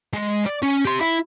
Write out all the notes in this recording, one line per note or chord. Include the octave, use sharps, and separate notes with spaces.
G#3
D5
C#4
G4 C6
E4